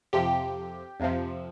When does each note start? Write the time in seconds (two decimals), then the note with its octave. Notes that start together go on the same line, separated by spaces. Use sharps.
0.13 F2 C3 F3 G4
1.00 F2 C3 F3